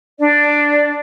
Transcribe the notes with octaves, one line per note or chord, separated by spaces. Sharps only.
D4 D5